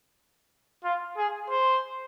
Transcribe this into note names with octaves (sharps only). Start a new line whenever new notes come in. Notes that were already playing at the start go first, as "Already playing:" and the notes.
F4
G#4
C5